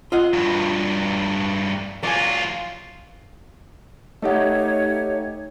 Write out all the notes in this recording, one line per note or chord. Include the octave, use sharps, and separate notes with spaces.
F4 D#5 F#5
G2 F#3
F#3 F4 D5 G#5
A3 D#4 G4 C#5 D#5 E5 F#5